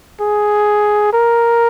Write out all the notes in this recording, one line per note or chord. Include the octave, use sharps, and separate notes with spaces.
G#4
A#4